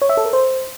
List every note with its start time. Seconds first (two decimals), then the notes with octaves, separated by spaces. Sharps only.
0.02 C#5
0.09 E5
0.17 A4
0.25 A#4
0.33 C5